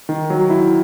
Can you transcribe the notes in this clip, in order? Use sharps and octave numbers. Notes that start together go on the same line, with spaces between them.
D#3
F#3
E4